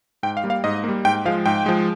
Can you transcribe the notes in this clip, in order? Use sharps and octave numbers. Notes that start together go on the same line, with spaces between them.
G#2 G5
F5
G3 A#3
F5
G#2 D#5
G3 A#3
G#2 G5
F3 G#3 F5
G#2 G5
F3 G#3